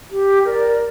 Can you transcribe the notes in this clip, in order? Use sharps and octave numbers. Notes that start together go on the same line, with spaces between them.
G4
A#4 D5